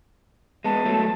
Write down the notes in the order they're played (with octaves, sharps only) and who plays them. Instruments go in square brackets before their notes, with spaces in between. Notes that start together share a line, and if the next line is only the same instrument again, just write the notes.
[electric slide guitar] G#3 B3 [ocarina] A5
[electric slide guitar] F#3 A3